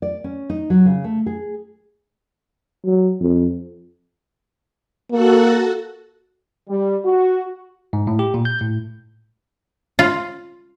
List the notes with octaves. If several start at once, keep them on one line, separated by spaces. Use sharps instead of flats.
D5
C#4
D#4
F#3
C#3
A3
G#4
F#3
F2
A#3 F#4 A4 F#5
G3
F#4
G#2
A2
G4
A#2
G6
A2
F4